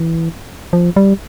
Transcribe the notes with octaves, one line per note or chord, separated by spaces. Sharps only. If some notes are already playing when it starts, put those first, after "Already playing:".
Already playing: E3
F3
G3